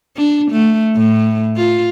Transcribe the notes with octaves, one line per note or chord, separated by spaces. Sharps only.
D4
A3
A2
F4